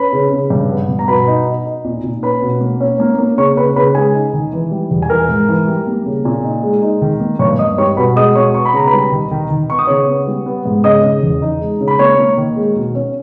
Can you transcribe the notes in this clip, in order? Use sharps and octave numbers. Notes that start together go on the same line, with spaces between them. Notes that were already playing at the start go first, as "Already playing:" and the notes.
Already playing: C#4 B4 B5
C#3
C#3
G2
B3
G2
A#5
B2 B4 B5
D#4
D#4
D#4
A#2
A#2
C#4 B4 B5
B2
A#3
C#4
A#3
A#3
C#3 C#5 C#6
C#3 B4 B5
C#3 B4 B5
G#3 G#4 G#5
D#4
D#3
E3
G3
E2
G#5
E3 A#4 A#5
G#2
E3
G3
A#3
C#3
A#2
D#4
G#3
D#4
D#3
A#3
G2 C#5 C#6
G2 D#5 D#6
G3 C#5 C#6
B2 B4 B5
G#3 D#5 D#6
B2 C#5 C#6
B3 C#6
B5
C#3 A#5
B4 B5
G3
D#3
D#3
D#3
B3 C#6
D#6
C#3 C#5 C#6
B3
G3
B3
G#2
C#3 D#5 D#6
C#3
E2
D#4
G#3
C#3
B5
A#3 C#5 C#6
A#3
D#3
G#3
B2
C#4